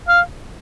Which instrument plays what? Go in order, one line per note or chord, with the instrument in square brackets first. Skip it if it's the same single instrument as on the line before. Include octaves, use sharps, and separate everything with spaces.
[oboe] F5